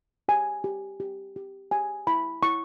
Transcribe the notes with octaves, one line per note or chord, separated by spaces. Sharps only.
G4 G#5
G4
G4
G4
G4 G#5
E4 B5
E4 C#6